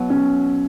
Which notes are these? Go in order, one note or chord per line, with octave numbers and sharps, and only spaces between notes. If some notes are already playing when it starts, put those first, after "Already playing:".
Already playing: B2 F#3 B3 E4
C#4